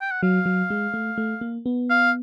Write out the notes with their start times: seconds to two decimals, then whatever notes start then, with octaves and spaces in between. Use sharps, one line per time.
0.01 G5
0.11 F#5
0.23 F#3 F5
0.46 F#3
0.70 G#3
0.94 A3
1.18 A3
1.41 A#3
1.66 B3
1.90 F5